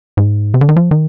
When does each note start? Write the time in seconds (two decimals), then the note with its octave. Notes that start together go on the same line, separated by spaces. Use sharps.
0.17 G#2
0.54 C3
0.61 D3
0.69 D#3
0.76 F3
0.91 D#3